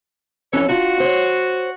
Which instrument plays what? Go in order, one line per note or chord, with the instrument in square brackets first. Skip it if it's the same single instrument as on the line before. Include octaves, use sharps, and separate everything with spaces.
[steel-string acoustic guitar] F2 C#4 [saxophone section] E3 A4 C#5
[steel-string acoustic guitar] D4 F4 [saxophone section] F#4
[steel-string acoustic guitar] C5 C#5